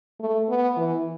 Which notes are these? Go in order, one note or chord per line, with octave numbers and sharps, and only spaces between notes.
A3
B3
E3